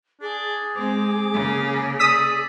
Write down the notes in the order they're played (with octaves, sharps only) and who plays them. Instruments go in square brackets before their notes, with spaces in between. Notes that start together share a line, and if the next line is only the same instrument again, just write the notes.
[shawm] D4 [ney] G#4
[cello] G#3 C4 [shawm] D6
[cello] C#3 A#3
[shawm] D5 [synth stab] D#6 E6 B6